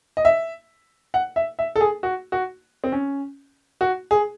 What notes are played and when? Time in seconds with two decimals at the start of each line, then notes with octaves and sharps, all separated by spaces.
0.17 D#5
0.25 E5
1.14 F#5
1.36 E5
1.59 E5
1.76 A4
1.81 G#4
2.03 F#4
2.32 F#4
2.84 C4
2.92 C#4
3.81 F#4
4.11 G#4